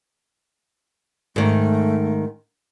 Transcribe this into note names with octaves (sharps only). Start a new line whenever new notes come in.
G#2 D#3 A3